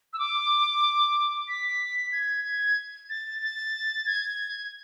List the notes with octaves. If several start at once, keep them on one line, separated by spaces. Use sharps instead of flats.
E6
D6
B6
G#6
G#6
A6
A6
G#6